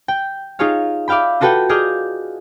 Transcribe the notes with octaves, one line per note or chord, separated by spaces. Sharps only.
G5
D#4 F4 G#4 C#5 F5
D5 E5 F5 G5 B5
F4 F#4 A4 B4 F#5 G5
G#4 D5 D#5 F6 G6